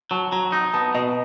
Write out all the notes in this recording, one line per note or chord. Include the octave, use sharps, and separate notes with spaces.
F#3 A5
F#3 A#5
D#4 A#5
B3 A5
B2 D#5